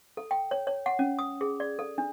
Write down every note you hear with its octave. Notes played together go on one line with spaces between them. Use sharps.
A4
G5
C#5
C#5
F#5
C#4
D#6
G#4
D5
A4
D4